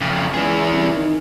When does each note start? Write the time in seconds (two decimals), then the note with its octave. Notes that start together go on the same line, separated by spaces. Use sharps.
0.01 F2 C#3
0.34 C#2 E3 G#4
0.73 C2
0.96 D#3